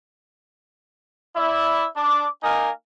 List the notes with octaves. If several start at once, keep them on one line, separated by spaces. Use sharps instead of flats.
E4 D5 E5
D4 D6
A#3 D#4 A#4 D#5 F5 G#5